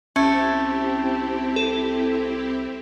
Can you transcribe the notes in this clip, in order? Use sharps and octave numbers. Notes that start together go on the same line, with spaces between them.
C2 A3 C4 C#4 E4 G4
A4